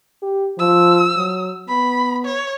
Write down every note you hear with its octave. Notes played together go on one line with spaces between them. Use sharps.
G4
F3 E6
F#3
B3 B5
C#5